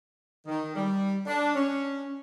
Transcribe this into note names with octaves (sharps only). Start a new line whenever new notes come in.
D#3
G3
D4
C#4